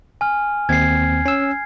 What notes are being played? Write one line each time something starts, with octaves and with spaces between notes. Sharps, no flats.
G#5 F6
D#2 C4 G#6 C7
C#4 E6